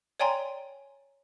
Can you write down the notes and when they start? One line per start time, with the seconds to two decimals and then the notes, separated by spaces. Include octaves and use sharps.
0.20 C#5 D5 G5 G#5 A#5 C6